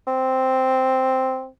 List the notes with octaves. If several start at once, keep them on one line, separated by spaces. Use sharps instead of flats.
C4